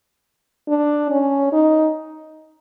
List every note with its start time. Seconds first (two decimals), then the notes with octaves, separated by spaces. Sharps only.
0.68 D4
1.10 C#4
1.53 D#4